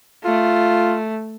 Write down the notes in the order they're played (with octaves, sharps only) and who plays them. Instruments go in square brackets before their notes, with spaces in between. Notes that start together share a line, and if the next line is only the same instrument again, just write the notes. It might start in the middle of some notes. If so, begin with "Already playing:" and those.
[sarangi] A3 [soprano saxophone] F4